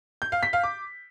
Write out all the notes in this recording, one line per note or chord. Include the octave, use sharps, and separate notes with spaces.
G6
F5
B6
F5
D6